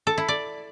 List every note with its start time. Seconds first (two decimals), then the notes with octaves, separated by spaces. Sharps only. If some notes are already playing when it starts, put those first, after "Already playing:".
0.07 A4
0.18 E4
0.28 D5